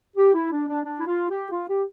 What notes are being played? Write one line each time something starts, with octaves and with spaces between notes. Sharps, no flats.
G4
E4
D4
D4
D4
E4
F4
G4
F4
G4